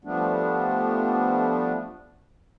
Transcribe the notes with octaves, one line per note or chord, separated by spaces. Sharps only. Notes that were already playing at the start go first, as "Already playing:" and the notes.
F3 G3 A3 B3 D4